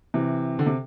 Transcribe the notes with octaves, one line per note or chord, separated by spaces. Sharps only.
C3 E3
D3
C3